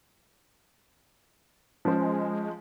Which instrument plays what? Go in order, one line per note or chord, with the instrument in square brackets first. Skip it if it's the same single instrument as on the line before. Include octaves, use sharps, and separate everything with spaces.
[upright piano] F3 C#4 C5 [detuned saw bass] G#3